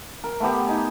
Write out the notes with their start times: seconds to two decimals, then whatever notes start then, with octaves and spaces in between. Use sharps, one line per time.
0.24 A#4
0.40 A3 B3 G4
0.67 D#4 G#5